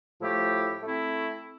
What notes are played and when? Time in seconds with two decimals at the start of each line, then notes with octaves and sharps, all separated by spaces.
0.19 A2 F3 A3 E4 G4
0.82 A3 C4 E4